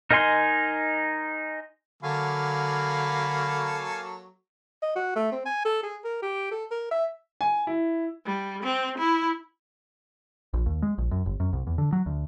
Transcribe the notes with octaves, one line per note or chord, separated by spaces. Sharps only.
D#4 A#4 D#5 G#5 C6
D3 F#3 A#3 A4 F5 G#5 B5
D#5
F#4
A3
C4
G#5
A4
G#4
A#4
G4
A4
A#4
E5
G#5
E4
G3
C4
E4
A#1
D#2
G#3
A#1
F#2
G1
F#2
C2
E2
D3
F#3
D2